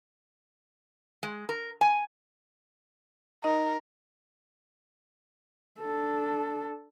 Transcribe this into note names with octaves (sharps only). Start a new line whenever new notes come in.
G#3
A#4
G#5
D#4 A#4 D#5
D4 A4